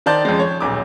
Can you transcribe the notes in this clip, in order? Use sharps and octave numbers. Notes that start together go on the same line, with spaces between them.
D#3 C5 D5 A5 G6
F2 C#3 G#3
C#5
D#1 B1 D6